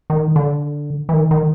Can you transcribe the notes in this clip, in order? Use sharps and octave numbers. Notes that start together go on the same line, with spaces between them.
D#3
D3
E3
D#3
D#3